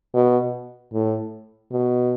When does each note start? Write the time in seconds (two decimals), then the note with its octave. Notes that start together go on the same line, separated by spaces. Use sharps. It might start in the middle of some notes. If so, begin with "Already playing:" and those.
0.14 B2
0.93 A2
1.72 B2